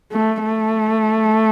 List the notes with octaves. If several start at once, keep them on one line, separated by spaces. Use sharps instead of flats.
A3
A3